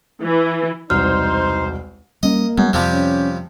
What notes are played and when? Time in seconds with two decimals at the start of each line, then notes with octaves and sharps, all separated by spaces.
0.22 E3
0.90 E1 C2 D#4 C5 F6
2.23 G3 A#3 C#4 D#5
2.58 F#2 G3 G#3 B3
2.73 F2 C3 F3 G3
2.92 C#4